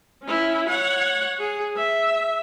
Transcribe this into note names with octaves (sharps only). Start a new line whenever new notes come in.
C#4 E4
C#5 F#5
G#4
E5